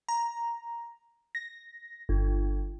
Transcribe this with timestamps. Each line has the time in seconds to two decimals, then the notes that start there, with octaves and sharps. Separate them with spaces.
0.09 A#5
1.35 A#6
2.09 G1